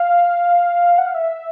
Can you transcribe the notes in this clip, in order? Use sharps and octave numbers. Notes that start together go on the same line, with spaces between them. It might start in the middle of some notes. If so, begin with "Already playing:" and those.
Already playing: F5
F#5
F5
E5